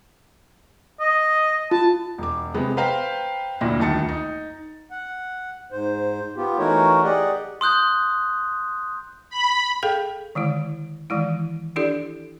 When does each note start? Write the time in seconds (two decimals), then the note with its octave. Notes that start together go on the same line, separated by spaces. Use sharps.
1.00 D#5
1.71 F4 A5
2.18 E1 D6
2.54 C3 G#3 B3
2.77 B4 C5 F5 G5 A#5
3.61 D2 A#2 E4 A#6
3.79 D#1 D2 D#3 A5 A6 C#7
4.08 D#4
4.91 F#5
5.72 G#2 C5
6.36 B3 F4 G4
6.59 E3 A3 D#4 F#4 A#4 C#5
7.03 G4 G#4 D5 D#5 F#5
7.61 C6 D#6 F#6 G6
9.30 B5
9.83 G#4 A4 F5 G5
10.35 D3 D#3 G#3 E4
11.10 D#3 E3 G#3 E4
11.76 D4 E4 G4 A4 D5